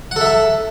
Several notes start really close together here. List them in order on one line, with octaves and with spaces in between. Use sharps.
F#5 A4 E5 A5